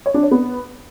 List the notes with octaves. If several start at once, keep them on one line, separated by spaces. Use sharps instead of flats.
C#5
D4
C#5
B3